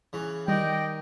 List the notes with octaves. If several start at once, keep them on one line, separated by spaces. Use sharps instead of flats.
C#3 E3
D#3 G3 D5 D#5 G5